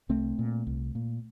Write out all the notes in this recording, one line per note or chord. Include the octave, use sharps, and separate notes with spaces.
C2 A3 C4
A#2
C2
A#2